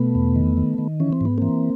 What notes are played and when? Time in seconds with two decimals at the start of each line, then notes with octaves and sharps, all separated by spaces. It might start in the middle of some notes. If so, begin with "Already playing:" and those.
Already playing: B2 A3 B3
0.15 E2
0.36 D#3
0.57 D#3
0.78 D#3
1.00 E3 C#4
1.13 C4
1.21 G#2 B3
1.38 E3 A#3 C4